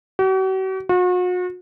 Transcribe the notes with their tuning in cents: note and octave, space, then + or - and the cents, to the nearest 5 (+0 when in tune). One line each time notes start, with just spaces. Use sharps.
F#4 +45
F#4 -40